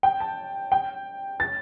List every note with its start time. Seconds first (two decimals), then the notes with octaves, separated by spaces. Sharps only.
0.03 G5
0.20 A5
0.72 G5
1.40 A6